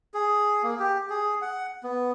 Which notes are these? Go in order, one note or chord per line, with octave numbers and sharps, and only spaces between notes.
G#4
A#3
G4
G#4
F#5
B3